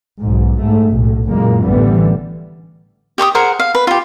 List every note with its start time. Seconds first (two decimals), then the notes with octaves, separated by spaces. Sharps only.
0.21 B1 G#2
0.60 G#2 A3
0.93 B1 A2
1.27 F#1 F#2 A#2 G#3 A#3
1.63 A1 D3 E3 G3 B3
3.18 G4 G5 C#6 D#6
3.35 G#4 A#4 C5 F#5
3.60 F5
3.75 B4
3.87 F4 G4